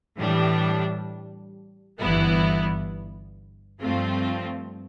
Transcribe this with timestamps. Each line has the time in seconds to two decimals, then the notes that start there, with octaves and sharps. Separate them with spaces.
0.17 A2 E3 G3 D4
1.99 G1 G2 E3 B3 E4
3.81 G2 F3 A3 C4 F4